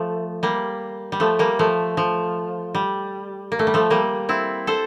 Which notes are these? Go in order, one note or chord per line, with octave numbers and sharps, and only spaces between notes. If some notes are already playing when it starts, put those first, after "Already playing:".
Already playing: F3 A3
G3 A#3
G3
F3 A3
G3 A#3
F3 A3
F3
G3
A#3
A3
G3
F3 A3
G3 A#3
C4 E4
A4 C5